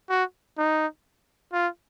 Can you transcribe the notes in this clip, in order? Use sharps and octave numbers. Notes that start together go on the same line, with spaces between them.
F#4
D#4
F4